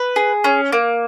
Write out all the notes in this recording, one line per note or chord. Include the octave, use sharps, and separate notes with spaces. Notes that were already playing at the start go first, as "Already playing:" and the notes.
Already playing: B4
G#4
C#4
A#3